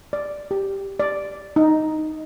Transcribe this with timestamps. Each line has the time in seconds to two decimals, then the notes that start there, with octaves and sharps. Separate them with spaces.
0.13 D5
0.51 G4
1.00 D5
1.56 D#4